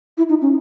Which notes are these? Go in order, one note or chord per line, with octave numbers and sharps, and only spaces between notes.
E4
D#4
C#4